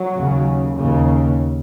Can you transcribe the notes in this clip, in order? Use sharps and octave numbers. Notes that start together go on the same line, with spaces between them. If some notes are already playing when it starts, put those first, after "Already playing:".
Already playing: F#3
D#2 C#3
D#2 C#3